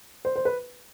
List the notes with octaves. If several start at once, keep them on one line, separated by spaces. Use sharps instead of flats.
C5
C5
B4